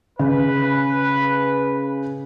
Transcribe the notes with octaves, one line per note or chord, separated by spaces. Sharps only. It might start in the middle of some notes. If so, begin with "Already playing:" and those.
C#3 B4